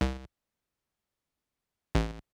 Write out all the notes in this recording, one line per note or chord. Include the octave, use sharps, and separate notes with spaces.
C2
A1